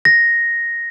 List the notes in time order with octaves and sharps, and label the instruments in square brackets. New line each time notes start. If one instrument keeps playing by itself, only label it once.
[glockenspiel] A#6